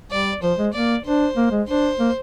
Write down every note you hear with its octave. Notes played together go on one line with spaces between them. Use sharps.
G3 D5
F3 C5
G#3
A#3 D5
D4 C5
A#3
G#3
D4 C5
A#3